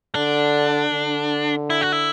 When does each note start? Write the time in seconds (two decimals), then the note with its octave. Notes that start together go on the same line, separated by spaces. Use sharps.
0.15 D3 D4
0.92 D3
1.70 E4
1.81 F#4
1.92 E4